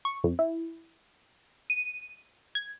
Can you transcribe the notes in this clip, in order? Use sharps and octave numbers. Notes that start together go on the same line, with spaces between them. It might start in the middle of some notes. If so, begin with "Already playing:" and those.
C#6
F2
E4
D#7
G#6